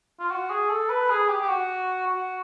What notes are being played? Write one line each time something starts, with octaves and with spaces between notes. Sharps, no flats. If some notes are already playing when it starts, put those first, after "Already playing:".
F4
F#4
G#4
A4
B4
G#4
G4
G4
F#4
F#4